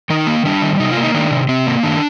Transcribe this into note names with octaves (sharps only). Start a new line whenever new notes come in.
D#3 D#4
A#3
G3 D4
D#3
C3 D#4
F4
A#3
D#4
D#3 D4
C3
C3 C4
A#3
D#3 D4